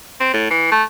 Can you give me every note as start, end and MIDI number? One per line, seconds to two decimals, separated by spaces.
0.20 0.33 60
0.34 0.48 45
0.50 0.69 52
0.71 0.83 57